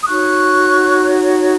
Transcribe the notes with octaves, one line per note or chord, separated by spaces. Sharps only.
D#6
D#4 F#4 C#5 C#6 F#6